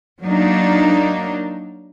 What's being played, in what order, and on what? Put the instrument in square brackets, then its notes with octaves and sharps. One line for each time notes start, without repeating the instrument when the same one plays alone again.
[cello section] F#3 A#3 D4 D#4